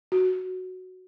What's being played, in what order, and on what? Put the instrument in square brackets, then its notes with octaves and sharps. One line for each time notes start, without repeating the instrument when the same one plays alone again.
[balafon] F#4